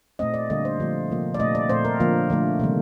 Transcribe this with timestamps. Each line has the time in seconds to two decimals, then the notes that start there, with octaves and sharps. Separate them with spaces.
0.19 A#2 A3 C4 D#5
0.34 D5
0.50 D3 G3 A#3 D#5
0.65 C5
0.80 D3 F3 A3 C4
1.10 C3 F3 A#3
1.34 D5
1.39 A#2 A3 C4 D#5
1.55 D5
1.69 A#2 A3 C4 C5
1.85 A#4
2.00 D3 F3 A#3
2.30 D3 F3 A3
2.60 C3 D#3 G3 A#3